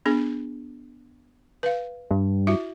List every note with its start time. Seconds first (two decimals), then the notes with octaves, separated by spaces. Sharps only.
0.06 B3 D4 G#4
1.63 B4 F5
2.11 G2
2.47 E4 F#4 E5